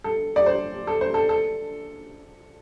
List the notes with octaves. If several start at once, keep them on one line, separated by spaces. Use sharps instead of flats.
A4
D5
C5
A4
C5
A4
A4